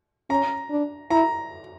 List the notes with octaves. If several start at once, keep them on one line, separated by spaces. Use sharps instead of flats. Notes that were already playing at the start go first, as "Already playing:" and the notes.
C#4 A#5
D4
E4 A#5